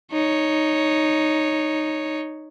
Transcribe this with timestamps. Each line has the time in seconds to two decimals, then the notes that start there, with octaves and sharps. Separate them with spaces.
0.12 D#4 C#5